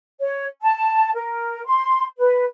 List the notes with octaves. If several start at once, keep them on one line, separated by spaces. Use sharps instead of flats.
C#5
A5
A#4
C6
B4